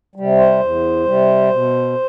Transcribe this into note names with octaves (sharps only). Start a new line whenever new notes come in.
C3 G3
C5
E2
C3 G3
B2